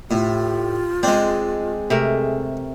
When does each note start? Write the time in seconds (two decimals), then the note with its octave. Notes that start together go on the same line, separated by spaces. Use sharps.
0.11 A2 F4 G4
1.03 G#3 C4 D4 G#4
1.90 C3 A3 A#4